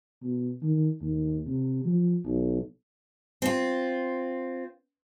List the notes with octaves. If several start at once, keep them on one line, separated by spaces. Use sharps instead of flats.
B2
D#3
D#2
C3
F3
B1
C4 F4